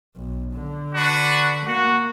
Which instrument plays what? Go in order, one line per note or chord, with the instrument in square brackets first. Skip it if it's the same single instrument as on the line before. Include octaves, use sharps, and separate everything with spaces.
[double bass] B1
D3
[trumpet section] D4 F#4 B4
[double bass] A#3 [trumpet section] F#4